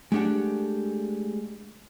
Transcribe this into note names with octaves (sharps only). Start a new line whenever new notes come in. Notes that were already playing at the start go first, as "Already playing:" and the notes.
G#3 A3 D4 G4 F#5